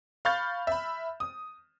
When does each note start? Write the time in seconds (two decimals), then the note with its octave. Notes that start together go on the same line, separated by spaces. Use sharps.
0.25 F5 B5 C#6 F6 G6 A6
0.67 E5 B5
1.20 D#6